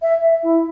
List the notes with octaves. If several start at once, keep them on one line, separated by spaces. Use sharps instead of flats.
E5
E4